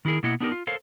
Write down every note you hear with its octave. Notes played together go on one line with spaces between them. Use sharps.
D#3 E4 F#4 G#4 A#4
B2 A#3 E4 D#5 F#5
B3 D4 D#4 G4 G#4 A#4
F4
A4 A#4 C5 C#5 F5